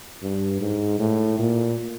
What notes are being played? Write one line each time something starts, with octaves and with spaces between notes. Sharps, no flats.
G2
G#2
A2
A#2